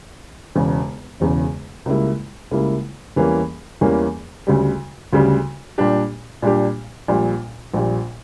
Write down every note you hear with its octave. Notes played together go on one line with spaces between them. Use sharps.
E1 E2 C#3
E1 E2 C#3
C#2 C#3 G3 A#3 E4
C#2 C#3 G3 A#3 E4
E2 E3 G3 A#3 C#4
E2 E3 G3 A#3 C#4
D2 C#3 G3
D2 C#3 G3
A#2 G3 D4 G4
A#2 G3 D4 G4
A#1 A#2 G3
A#1 A#2 G3